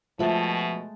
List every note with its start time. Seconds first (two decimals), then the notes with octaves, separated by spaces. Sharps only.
0.19 B2 F3 G#3 A3 E5 B5